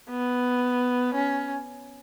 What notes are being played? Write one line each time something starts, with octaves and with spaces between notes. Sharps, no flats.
B3
C#4